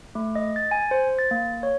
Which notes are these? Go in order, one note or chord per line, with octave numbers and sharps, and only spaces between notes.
A3
D#5
A6
G#5
C5
A6
A#3
C#5